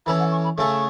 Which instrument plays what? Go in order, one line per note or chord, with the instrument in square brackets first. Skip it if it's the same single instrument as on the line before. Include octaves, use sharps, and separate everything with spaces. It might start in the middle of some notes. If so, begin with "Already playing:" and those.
[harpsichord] E3 C#4 A4 [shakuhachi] B5
[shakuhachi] F#5
C#6
B5
[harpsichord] C#3 A3 C#4 A4 [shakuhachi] C#6